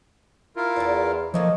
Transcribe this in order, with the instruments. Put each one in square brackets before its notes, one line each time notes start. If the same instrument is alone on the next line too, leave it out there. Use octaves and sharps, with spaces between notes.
[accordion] E4 F4 A#4
[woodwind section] E2 [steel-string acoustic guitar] G2 D5
[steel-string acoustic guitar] B2 D3 C4 [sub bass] F3 [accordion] A3 A#3 [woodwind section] C#5 D#5